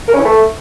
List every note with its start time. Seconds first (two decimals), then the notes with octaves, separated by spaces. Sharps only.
0.08 A#4
0.13 C#4
0.19 E3
0.24 A3